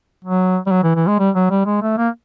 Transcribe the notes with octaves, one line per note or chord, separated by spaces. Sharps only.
F#3
G3
F#3
E3
E3
G#3
G3
F#3
G3
G#3
A3
A#3